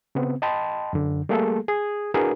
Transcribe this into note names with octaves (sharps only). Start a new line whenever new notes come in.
C#3 B3 C4
D#5 G5 A5 B5 C6
F#2 D3
G3 A3 A#3 G#4 A4
G#4 D#6 G#6
D4 E4 F#4 G#4 A#4 B4